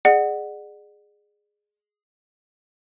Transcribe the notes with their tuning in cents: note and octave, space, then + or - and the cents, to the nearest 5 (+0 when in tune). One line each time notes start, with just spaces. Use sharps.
G#4 +0 D5 +35 F#5 +0